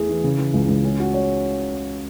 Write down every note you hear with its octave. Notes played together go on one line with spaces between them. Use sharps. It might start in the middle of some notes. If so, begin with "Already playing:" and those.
Already playing: E2 A3 E4 G#4
E3
C#3
E3
C#2
C#2
C#4
F#4
C#5